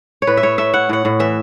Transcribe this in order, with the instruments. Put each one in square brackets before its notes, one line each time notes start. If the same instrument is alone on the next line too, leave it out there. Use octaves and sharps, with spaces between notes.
[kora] C#5
A2 B4
E5
A2 C#5
A3 E5
E4 F#5
A2 F#5
A2
E3 E5